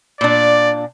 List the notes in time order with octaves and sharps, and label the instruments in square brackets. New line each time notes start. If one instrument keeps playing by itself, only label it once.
[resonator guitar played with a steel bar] A#2 D4 [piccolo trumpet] D5